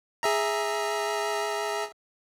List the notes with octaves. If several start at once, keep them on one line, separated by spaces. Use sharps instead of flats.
G#4 E5 A#5